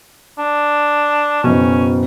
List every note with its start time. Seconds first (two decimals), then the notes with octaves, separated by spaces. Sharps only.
0.39 D4
1.44 F#1 B2 C#4